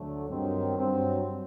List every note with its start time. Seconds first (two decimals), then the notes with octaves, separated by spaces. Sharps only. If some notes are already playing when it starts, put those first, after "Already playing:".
Already playing: D2 D3 F#3 A3
0.29 G2 D#3 F#3 C4
0.77 G2 F#3 C4